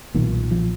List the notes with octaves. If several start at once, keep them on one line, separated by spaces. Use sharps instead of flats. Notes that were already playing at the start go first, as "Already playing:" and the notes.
B1 A#2 D#3
F3